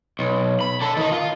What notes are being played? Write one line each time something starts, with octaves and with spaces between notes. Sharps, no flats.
B1
B5
D3 A4
D#3 D#4
F4